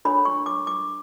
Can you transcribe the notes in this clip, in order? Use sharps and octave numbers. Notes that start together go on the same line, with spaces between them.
D4 A4 C#5 B5
C#6
D6
D6